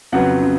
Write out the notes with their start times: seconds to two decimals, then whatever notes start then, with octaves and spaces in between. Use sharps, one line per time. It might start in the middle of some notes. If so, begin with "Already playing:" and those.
0.12 F2 C#3 F#3 B3 F#5
0.43 C#3